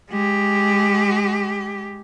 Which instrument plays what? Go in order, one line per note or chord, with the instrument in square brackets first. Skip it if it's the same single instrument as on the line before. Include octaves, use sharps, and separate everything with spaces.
[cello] G#3 G4